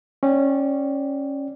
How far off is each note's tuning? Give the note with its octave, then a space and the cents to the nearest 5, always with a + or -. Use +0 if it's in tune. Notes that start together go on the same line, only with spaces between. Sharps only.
C#4 -15 D5 +0 G5 -5